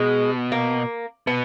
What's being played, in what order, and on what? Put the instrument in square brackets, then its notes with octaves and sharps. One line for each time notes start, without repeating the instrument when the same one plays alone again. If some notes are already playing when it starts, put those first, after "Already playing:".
Already playing: [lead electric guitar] B2 [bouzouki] G#3
[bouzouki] A#3
[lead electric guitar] B2 [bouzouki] B3